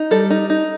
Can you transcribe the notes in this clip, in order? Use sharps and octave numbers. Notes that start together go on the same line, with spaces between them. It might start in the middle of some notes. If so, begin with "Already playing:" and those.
Already playing: D#4
G3 A4
D#4
D#4